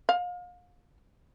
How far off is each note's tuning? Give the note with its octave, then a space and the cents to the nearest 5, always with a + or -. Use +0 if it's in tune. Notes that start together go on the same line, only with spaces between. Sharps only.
F5 +35